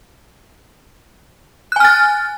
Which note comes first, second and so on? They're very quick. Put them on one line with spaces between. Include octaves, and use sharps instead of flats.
F#6 G#5 F6 A6